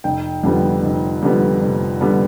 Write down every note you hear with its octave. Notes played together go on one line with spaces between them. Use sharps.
F1 G5
F2 D3 G3 B3
F1
F2 D3 G3 B3
F1
D3 G3 B3